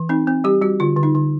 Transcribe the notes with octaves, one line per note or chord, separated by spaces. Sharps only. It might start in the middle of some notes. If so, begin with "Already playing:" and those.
Already playing: E3
C4 D#4
C4
G3 G4
G3 F#4
D3 F4
D3
D#4
D3